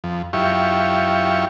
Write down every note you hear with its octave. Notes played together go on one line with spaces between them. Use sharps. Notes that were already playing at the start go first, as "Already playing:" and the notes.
F2
F#2 E4 F4 G4 C#6